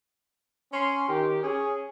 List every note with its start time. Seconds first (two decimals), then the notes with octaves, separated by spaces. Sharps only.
0.73 C#4 C6
1.08 D#3 G4
1.43 C#4 G#4